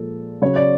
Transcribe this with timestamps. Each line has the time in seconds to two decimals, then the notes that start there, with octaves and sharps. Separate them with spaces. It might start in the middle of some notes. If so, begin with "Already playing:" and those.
Already playing: A#2 F3 G#3 A4
0.42 C#3 F#3 C#5
0.56 D5